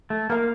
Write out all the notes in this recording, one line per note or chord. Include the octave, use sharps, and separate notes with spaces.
A3
A#3 A#4 F5